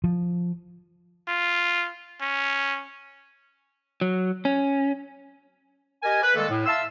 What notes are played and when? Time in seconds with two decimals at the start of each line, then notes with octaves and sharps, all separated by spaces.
0.04 F3
1.28 F4
2.21 C#4
4.01 F#3
4.45 C#4
6.03 G4 A#4 D#5 G#5
6.22 B4
6.35 D#3 G3 G#3 A#3 A4
6.50 A2
6.66 E5 F5 A5 C6 E6